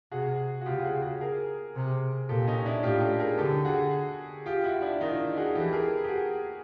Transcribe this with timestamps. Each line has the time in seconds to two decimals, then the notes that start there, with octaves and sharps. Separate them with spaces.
0.11 C3 F#4 G#4
0.61 F#4
0.66 C#3 F4 G4
0.85 F#4 G#4
1.02 F#4 G#4
1.21 G#4 A#4
1.75 C3
2.29 A#2 G4 A4
2.47 C#4 D#4
2.66 D4 E4
2.83 A2 F4 G4
3.01 G4 A4
3.20 G#4 A#4
3.37 D3 G4 A4
3.65 F#4 G#4
4.46 F4 G4
4.64 E4 F#4
4.82 D4 E4
5.00 D#3 D#4 F4
5.36 F#4 G#4
5.55 E3 G4 A4
5.73 G#4 A#4
6.04 G4
6.09 F#4 G#4